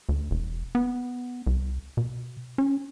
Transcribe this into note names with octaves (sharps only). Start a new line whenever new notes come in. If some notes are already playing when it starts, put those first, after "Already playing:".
D2
E1
B3
C2
B2
C#4